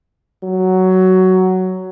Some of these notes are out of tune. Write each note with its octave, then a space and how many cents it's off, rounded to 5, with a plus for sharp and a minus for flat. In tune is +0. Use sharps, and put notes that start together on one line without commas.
F#3 +10